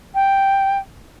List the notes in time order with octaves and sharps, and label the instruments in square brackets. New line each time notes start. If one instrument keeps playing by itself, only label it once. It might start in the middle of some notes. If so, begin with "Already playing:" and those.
[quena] G5